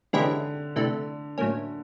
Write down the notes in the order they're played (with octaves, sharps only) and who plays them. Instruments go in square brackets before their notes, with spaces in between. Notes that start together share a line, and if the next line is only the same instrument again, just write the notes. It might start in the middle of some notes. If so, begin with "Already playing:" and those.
[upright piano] D3 [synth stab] E3 G#3 C#4 E4 G4
[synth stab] C3 E3 A3 D4
A2 F#3 A#3 C#4